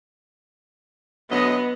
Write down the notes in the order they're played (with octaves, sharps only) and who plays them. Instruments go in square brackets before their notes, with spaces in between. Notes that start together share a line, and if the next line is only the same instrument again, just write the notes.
[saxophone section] D2 F#3 D#5 [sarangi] B3